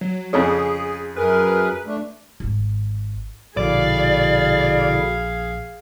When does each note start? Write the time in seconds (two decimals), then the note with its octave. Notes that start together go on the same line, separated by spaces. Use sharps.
0.01 F#3
0.33 F2 C#3 C#4 G#4
1.17 F#2 G#4 A#4 B4
1.87 A3 D4
2.40 D#1 G#1
3.57 A#1 B2 D3 E4 G#4 D5 F5